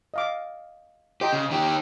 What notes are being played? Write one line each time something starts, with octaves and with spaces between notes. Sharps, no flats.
D#5 F5 D6
G4 C5 D#5 A#5
C#3
D#3 G4